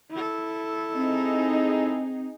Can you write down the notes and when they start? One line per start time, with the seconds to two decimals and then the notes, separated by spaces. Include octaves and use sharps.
0.11 E4 A4
0.95 C4 D#4 G#4